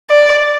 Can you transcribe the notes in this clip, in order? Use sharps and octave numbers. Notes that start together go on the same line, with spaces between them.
D5